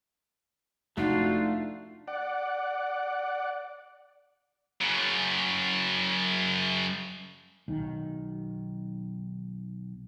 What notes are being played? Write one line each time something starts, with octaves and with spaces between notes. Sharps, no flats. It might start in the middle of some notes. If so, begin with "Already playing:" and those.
F1 F2 G#2 A3 D4 D#4 F4 F#4
D5 F#5
F#2 C#3
B1 D#3